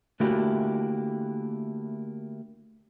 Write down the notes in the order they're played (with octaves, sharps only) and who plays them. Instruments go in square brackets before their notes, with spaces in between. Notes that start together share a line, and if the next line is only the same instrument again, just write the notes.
[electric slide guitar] D3 A3 A#3 E4 F#4 G4